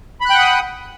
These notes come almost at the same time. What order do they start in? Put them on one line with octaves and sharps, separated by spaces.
B5 F#6 G5 F#5 D#6